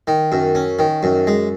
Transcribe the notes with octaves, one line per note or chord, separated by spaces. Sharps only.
D#3
F#2
C#4
D#3
F#2
G#3